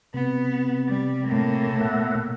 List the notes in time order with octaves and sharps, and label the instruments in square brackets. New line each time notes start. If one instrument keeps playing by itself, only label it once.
[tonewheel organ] C3 [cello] B3
[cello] G3
A2 A#3
[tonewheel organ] B2 E5 F#5